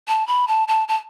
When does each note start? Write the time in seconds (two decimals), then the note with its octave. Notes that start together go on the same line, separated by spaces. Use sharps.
0.08 A5
0.27 B5
0.48 A5
0.68 A5
0.88 A5